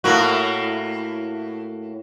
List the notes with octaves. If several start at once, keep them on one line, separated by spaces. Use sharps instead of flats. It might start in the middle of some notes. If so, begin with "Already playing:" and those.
A2 A#3 F#4